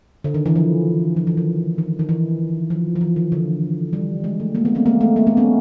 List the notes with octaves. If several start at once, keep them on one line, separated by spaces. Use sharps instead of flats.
D3
D#3
E3
F3
F3
E3
D#3
D#3
D#3
E3
F3
F3
E3
D#3
D3
G3
G#3
A3
G#3 A#3
A3 B3
A#3 C4
G#3 A#3
A3
G#3 A#3
A3 B3
B3 C#4